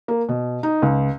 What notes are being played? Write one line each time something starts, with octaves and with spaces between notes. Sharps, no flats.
A#3
B2
D#4
C#2